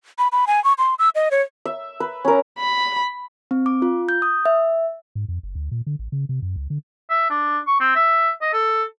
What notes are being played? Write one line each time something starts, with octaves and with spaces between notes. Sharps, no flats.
B5
B5
G#5
C#6
C6
E6
D#5
C#5
E5
B4
C#4 A#4
B5
C4
D6
F4
G6
D#6
E5
G#2
F2
F#1
D2
A#2
D3
A1
C#3
C3
F#2
C#2
D3
E5
D4
C#6
C4
E5
D#5
A4